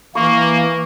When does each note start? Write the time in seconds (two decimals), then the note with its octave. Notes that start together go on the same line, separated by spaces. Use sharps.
0.15 E3 A#3 C#6